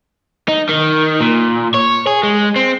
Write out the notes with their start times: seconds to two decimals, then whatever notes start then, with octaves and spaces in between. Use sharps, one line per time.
0.48 D#4
0.69 D#3
1.21 A#2
1.74 C#5
2.07 G#4
2.23 G#3
2.56 C4